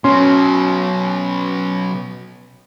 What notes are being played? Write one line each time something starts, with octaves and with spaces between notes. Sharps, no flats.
B2 F#3 C#4 C6